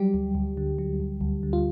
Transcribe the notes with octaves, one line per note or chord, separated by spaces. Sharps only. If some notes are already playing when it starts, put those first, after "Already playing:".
Already playing: F#3 G3 G4
D2
D2
D3
F#3
D2
D2
D3
F4